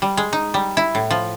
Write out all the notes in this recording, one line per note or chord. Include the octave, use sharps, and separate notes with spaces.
G3
G#3
D#4
G3
E4
A2
F3